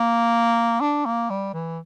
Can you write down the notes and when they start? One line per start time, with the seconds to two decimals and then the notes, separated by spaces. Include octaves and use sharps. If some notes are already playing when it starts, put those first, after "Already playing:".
Already playing: A#3
0.81 D4
1.05 A#3
1.30 G3
1.53 E3